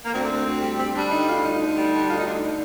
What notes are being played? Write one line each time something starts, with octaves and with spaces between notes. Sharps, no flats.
A#3
D2 C4
D2
D2
G3
G3 C4
G3 D4
D3 D#4
D2 F4
D2 D#4
D3
G3
D3
D2 F4
D#4
D3 D4
D#4
D3